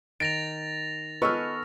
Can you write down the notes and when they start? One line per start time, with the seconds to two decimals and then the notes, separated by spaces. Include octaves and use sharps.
0.20 D#3 A6 A#6 D7 F7
1.22 B3 A4 B4 D#5 G#5 C#6 E6 F6